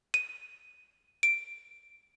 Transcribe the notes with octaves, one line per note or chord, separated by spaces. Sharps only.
D#7
D7